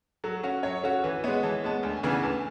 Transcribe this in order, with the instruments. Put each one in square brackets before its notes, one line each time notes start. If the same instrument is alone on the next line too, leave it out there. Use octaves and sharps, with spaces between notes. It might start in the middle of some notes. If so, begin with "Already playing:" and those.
[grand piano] F#3 [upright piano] A4
[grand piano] C#4 F#4
[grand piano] F#3 [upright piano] C#5
[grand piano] C#4 F#4 [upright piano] A4
[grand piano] E3 [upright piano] B4
[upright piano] B4
[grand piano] G#3 B3 [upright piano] C#5
[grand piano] E3 [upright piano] A5
[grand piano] G#3 B3 [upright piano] A5
[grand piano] D2 [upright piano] G#5
[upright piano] G#5
[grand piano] C#3 E3 B3 D4
[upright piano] G#5
[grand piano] D2 [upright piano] A5